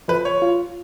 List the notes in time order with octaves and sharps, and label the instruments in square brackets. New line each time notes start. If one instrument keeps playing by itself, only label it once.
[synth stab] F3 [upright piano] B4
[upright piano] C#5
[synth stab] F4